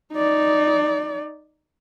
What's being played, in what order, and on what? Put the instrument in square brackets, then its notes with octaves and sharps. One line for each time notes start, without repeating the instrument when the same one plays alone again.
[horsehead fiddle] D#4 D5